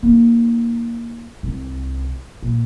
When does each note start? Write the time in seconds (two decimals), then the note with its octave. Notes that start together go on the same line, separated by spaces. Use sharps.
0.03 A#3 D#4
1.43 C2
2.42 A#2